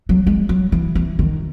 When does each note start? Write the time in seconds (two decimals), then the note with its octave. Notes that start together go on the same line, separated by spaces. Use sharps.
0.09 F#3
0.27 G#3
0.49 F#3
0.72 E3
0.95 E3
1.19 D#3